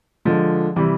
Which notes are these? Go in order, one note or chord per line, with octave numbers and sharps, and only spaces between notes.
D3 F3 G#3
C3 E3 G3